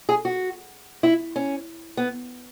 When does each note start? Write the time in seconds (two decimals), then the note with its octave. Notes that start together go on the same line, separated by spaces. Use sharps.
0.09 G#4
0.25 F#4
1.03 E4
1.36 C#4
1.97 B3